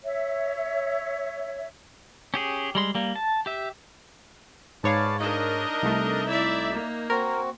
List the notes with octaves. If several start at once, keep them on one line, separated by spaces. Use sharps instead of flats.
C#5 E5
C#4 G4 G#4
G3 G#3 C6
G3 A#3
A5
G4 E5
G#2 B4 C#5 D5 F5 A5
D4 D#4 A#4 D#5
C2 A3
E4 D5 E5
A#3
C4 F#4 A#4